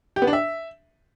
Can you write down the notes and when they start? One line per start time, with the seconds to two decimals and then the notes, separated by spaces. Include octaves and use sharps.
0.16 G4
0.22 B3
0.27 D4
0.33 E5